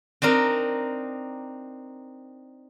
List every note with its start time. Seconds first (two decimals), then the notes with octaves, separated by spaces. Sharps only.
0.22 C4 D4 D#4 A#4